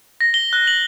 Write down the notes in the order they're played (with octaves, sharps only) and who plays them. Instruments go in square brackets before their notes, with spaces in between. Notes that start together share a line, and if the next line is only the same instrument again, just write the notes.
[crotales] A#6
G7
F#6
F#7